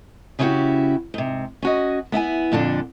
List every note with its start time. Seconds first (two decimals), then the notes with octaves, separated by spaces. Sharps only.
0.39 C#3 C#4 D#4 E4 F#4 G4
1.14 G#2 C3
1.62 C#4 F#4 D#5
2.12 B3 E4 E5 G#5
2.52 F2 A#2 D3 D4